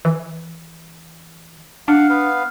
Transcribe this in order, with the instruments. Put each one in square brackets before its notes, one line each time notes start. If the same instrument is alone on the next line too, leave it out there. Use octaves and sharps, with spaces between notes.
[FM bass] E3
[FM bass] D4 [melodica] F5 F#5
[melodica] B3 B4 F5